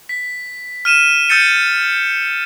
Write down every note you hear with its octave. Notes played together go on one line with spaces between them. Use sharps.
B6
F6 D#7 E7
E6 G6 A6 C#7 D#7